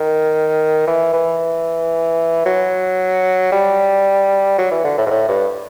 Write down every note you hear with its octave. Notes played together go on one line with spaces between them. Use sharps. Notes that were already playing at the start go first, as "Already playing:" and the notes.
Already playing: D#3
E3
E3
F#3
G3
F#3
E3
D3
A2
G#2
A2
G2